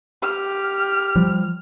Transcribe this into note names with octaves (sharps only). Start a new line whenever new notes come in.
G4 F6
F3 G3